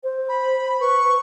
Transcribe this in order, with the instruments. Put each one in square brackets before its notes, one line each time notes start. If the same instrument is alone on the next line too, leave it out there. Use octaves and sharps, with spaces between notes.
[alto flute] C5
[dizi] B5
[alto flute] B4 [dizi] C#6